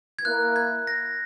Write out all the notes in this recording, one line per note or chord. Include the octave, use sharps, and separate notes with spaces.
G#6
A#3 E4 A#4 F#6
G#6
A#6